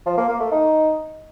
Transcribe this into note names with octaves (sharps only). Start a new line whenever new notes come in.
F3
A#3
A#3
A3
D#4